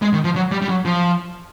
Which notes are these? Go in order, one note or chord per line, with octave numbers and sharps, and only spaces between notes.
G#3
D#3
F3
F#3
G3
G3
F#3
F3